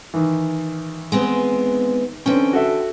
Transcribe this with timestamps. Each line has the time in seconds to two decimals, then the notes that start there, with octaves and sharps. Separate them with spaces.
0.14 D#3 E3
1.12 G#3 B3 C4
2.26 D3 E3 C4 C#4 G5
2.53 F#4 A4 E5